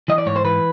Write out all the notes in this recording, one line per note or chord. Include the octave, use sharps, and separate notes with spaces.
E3 D#5
D5
G#2 C#5
C5
E3 B4